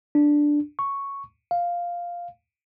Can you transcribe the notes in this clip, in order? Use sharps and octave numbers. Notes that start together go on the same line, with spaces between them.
D4
C#6
F5